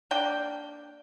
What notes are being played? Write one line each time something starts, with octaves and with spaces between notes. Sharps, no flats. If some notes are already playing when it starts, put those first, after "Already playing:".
A#3 D4 G5